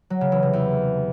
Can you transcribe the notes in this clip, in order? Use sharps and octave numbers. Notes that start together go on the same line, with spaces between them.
F#3
C#3
E3
C3
E2